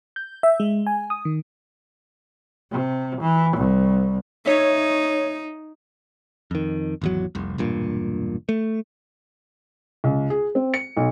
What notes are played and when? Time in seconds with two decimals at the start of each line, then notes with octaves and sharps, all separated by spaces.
0.16 G6
0.43 E5
0.60 G#3
0.87 G#5
1.10 D#6
1.25 D#3
2.72 C3
3.21 E3
3.57 C2
4.46 D#4 C#5 E5
6.51 F2 D#3
7.02 G#1 E2 F#3
7.35 F1 C2
7.58 E1 G2 A#2
8.49 A3
10.04 C#2
10.30 G#4
10.55 C4
10.74 C#7
10.97 B1